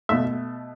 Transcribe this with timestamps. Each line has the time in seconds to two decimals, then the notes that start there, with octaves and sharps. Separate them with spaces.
0.09 B2 A3 E5